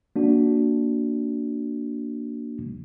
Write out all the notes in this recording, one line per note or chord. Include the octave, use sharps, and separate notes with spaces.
A#3 D4 F#4